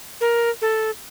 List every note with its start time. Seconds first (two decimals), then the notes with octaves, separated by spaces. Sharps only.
0.21 A#4
0.62 A4